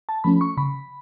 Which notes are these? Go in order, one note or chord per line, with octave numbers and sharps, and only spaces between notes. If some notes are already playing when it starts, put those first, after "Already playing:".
A5
F3 A3 C#4 B5
C#6
C#3 B5